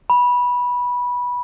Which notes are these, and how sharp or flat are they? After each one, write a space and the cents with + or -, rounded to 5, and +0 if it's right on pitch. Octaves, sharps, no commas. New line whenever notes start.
B5 -15